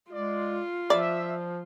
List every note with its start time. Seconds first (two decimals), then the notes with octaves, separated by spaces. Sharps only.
0.12 G#3 F4 D5
0.90 F3 D5 E5